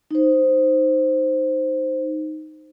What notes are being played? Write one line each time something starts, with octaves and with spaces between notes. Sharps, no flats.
D#4 C5